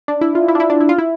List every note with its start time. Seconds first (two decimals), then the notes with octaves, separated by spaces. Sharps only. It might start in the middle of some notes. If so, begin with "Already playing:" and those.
0.08 D4
0.21 E4
0.35 F4
0.48 E4
0.55 D4
0.60 E4
0.70 D4
0.81 E4
0.89 F4
0.98 E4